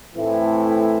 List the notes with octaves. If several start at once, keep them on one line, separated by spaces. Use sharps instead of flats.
A2 E3 A3 C4 E4